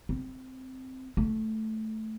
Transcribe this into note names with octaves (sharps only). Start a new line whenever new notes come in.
C4
A3